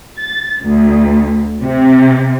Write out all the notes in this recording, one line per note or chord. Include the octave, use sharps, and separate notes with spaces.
A6
D2
C3